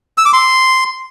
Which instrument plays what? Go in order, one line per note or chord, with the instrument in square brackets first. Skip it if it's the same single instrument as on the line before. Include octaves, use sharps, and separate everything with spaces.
[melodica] E6
D6
C6